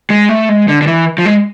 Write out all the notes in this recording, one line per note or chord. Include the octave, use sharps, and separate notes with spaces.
G#3
A3
G#3
D3
D3
E3
F3
G#3